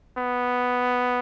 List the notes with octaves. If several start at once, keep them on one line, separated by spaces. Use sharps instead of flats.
B3